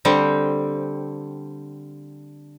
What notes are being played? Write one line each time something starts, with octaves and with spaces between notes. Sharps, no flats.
D3 G3 C4